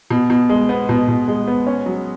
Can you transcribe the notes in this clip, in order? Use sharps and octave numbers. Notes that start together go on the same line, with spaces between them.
B2
B2
G#3
B3
B2
B2
G#3
B3
C#4
F#3